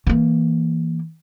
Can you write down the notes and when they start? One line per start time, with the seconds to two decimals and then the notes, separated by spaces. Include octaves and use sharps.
0.07 E3 A#3